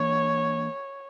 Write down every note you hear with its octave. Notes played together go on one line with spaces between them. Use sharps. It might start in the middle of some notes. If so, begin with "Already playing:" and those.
Already playing: E3 A#3 D4 C#5